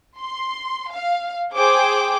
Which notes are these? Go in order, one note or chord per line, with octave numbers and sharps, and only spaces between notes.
C6
F5
G#4 C5 G5 D6